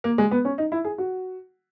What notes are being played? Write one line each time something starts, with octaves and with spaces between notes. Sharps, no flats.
A#3
G#3
B3
C#4
D#4
E4
G#4
F#4